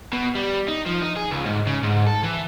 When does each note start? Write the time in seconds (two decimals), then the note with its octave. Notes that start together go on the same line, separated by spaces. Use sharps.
0.13 B2
0.36 G3
0.69 D#4
0.86 F3
1.02 D#4
1.17 G#4
1.31 C#2
1.45 G#2
1.67 C#3
1.84 G#2
2.08 A4
2.24 E3